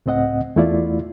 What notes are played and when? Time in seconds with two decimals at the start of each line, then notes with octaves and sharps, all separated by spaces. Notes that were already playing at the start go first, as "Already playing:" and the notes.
0.06 C#2 A2 C4 D#5 F#5
0.56 E2 A3 E4 F4 D5